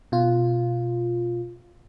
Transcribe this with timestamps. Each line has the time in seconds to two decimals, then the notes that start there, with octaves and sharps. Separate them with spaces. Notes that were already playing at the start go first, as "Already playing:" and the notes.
0.12 B2 F4